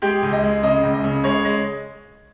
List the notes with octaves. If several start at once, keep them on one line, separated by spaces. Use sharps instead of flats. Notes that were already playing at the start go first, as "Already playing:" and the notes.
G#3 G4 G5
C#2
D#5
G#3
C#3 D#5
C#2
D#5
C#3
G#3 C#5
G#3